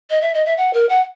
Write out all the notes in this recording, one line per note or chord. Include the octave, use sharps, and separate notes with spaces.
D#5
E5
D#5
E5
F#5
A#4
F#5